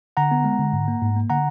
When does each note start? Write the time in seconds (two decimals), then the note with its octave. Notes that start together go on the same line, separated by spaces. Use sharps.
0.17 D3 F#5 A#5
0.31 B3
0.45 G#3
0.59 D3
0.73 G#2
0.88 A#3
1.02 G#2
1.16 A#3
1.30 D3 F#5 A#5